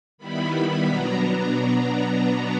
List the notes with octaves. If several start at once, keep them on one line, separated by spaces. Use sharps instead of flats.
D#3 G3 B3 E4 B5
B2 F#3 B3 D4 A#5
A#5